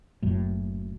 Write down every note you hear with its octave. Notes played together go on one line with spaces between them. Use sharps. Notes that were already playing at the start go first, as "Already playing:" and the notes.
F#1 F#2 A2